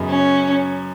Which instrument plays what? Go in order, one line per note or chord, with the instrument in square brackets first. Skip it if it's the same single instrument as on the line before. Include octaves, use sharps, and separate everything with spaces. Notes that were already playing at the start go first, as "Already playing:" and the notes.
Already playing: [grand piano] F#2 C#3 B3 D#4
[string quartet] C#4